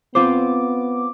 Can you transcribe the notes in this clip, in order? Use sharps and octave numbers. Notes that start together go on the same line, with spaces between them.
B3 C4 F4 C5 D6